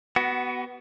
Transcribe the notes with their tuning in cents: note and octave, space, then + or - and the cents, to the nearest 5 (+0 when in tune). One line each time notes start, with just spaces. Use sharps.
B3 +0 F#4 +25